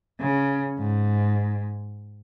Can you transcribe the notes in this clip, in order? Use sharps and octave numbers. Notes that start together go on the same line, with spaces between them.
C#3
G#2